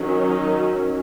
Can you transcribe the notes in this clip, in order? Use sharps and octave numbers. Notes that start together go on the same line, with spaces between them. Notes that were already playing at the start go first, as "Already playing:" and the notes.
Already playing: D#3 F#3 C#4
D#4